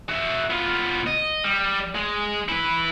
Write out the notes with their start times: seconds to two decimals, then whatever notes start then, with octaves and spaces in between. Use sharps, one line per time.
0.09 F#4 E5
0.50 B3 F4
1.06 D#5
1.44 G3
1.95 G#3
2.48 E4 B4